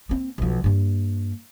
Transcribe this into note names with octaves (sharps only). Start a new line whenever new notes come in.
A#3 C4
B1 F3
G2 A#3